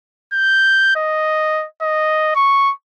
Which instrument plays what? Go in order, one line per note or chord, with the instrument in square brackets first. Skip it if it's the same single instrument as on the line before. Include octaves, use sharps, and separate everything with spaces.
[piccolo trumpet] G6
D#5
D#5
C#6